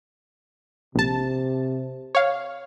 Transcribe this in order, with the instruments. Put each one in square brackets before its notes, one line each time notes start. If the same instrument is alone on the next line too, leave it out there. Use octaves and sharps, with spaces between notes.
[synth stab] A#1 A5 [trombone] C3
[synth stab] C#5 F5